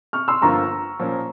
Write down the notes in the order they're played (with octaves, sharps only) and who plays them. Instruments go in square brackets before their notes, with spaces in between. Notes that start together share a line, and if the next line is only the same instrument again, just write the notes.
[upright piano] C#6 F6
C6 E6
[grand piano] G1 G2 F3 A#3 F4 [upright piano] A#5 C#6
[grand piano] A#2 F3 A#3 C#4